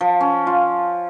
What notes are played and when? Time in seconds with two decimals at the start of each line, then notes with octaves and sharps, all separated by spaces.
0.01 F3
0.21 C#4
0.47 F4